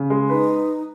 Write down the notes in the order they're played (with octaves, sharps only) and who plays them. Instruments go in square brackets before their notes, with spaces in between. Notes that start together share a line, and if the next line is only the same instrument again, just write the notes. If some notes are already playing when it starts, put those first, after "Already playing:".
Already playing: [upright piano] C#3
G#3
[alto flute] D#4 [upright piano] B4